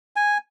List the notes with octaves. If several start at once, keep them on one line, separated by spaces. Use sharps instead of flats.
G#5